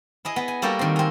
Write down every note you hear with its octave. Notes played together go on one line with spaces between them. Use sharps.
E4 G#4 D#5
B3
G#5
G3 A#3 F#4 G4 A4
D#3 C4
G#3 C4